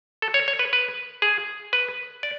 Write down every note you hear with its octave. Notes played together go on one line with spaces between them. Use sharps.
A4
C#5
C#5
B4
B4
G#4
B4
D5